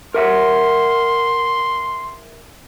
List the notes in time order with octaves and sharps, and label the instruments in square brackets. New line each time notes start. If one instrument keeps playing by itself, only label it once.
[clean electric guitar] A#4 E5 F#5 [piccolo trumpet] C6